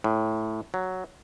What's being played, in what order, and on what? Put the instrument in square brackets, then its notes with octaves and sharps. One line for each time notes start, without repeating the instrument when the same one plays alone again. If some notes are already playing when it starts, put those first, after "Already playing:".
[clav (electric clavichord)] A2
F#3